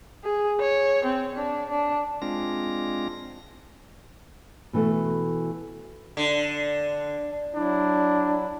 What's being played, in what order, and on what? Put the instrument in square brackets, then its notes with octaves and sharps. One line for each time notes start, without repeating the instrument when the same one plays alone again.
[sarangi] G#4
C#5
C4
D4
D4
[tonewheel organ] G#3 C4 D4 F4 A#6
[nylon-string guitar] B2 E3 A3 F#4 A4
[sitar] D3
[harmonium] F#3 E4 [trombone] D4